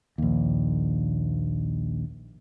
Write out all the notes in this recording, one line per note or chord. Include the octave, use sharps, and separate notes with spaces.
A#1 D#2